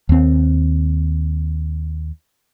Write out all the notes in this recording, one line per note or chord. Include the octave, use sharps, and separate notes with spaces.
D#2 C4